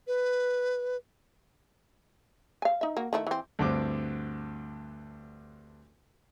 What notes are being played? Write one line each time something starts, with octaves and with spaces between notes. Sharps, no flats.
B4
F5 G#5
D#4 E5
A#3 F#4
D#3 A3 E4
E3 C4
D2 G2 D3 C4 D6